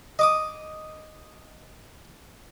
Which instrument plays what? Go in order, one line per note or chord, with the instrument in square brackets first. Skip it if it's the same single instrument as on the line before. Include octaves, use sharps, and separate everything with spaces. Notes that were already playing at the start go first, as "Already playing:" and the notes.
[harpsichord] D#5 D6 D#6